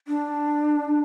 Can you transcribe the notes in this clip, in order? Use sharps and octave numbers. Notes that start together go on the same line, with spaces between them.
D4